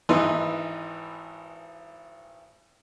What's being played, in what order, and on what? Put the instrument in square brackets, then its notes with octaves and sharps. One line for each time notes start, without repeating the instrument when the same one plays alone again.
[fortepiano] G#1 E3 D#4 B4 C6